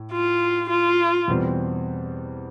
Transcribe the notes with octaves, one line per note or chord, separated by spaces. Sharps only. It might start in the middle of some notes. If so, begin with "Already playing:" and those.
Already playing: A2
F4
F4
E2 B2 G3 C4